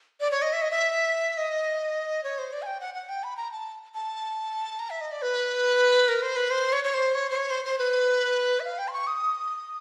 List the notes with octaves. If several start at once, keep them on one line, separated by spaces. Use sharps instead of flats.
D5
C#5
D#5
E5
D#5
E5
D#5
C#5
C5
D5
G#5
G5
F#5
F#5
G5
B5
A#5
A5
A5
A#5
E5
D#5
D5
B4
A#4
C5
B4
C5
C#5
C#5
C5
C#5
C5
C#5
C5
C5
B4
E5
F5
G5
C6
C#6
D#6